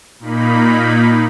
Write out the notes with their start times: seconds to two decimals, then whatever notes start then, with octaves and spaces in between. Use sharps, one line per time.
0.20 A#2 A#3 D#4 B5